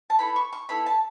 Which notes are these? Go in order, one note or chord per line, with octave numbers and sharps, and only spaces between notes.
A5
B3 E4 A4 B5
C#6
C#6
B3 E4 A4 B5
A5